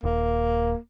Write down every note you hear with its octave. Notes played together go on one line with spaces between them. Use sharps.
D#1 A#3